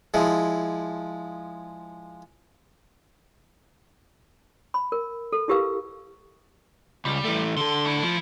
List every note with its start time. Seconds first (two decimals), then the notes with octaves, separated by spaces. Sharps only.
0.14 F3 G#3 E4
4.74 B5
4.92 A#4
5.33 A4
5.48 E4 F4 G4 A#4 B4 F5
7.05 C#2 G3
7.25 E3 A3
7.57 D3 A4 C6
7.85 A3 E4
8.04 F3